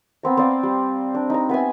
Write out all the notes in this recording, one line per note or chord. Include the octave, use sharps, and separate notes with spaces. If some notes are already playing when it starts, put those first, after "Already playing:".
B3 C4 A#5
C4 C5 D5 F5
G3
D4
D#4 A#5
B3 B4 E5 G#5